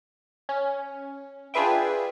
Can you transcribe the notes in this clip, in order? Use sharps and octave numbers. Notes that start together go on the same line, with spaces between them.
C#4
D4 F4 G#4 B4 E5 G5